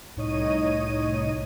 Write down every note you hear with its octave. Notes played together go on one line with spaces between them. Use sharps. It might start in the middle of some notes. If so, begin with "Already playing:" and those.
C2 A2 D#4 C#5 D#5 D#7